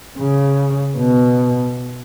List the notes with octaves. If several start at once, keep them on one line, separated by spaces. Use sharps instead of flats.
C#3
B2